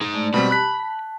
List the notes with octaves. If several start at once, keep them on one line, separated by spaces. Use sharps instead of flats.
D#4 G#4
G#3 A3 D5
B2 G3 C4 G4 B5
A5 F#6 B6